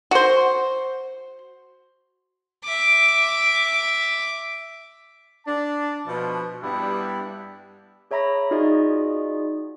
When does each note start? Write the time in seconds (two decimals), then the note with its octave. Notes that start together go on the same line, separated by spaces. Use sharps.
0.11 F#4 C5
2.64 E5 D6
5.46 D4 A5
6.06 B2 F3
6.62 G2 G3 B3 D4 E4 G4
8.11 G#4 C#5 E5 A#5 B5 A#6
8.51 D#4 F4 F#4 G#4 D5 D#5